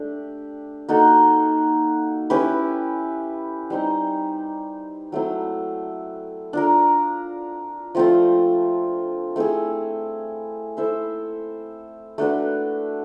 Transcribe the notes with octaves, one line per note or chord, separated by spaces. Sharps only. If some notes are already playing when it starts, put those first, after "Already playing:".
Already playing: A3 D4 G4
A#3 D#4 F#4 A4
C#4 E4 G4 B4
G3 C4 D#4
F#3 A3 C4 E4
D4 F4 A#4
F3 A3 C4 F4
A3 C4 E4 G#4
E4 A4 C5 E5
A3 D4 F#4 B4